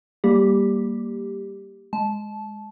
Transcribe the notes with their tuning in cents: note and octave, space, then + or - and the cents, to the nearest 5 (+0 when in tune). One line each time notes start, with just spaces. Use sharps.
G3 +0 A#3 +0 G4 +5
G#3 +0 A5 -20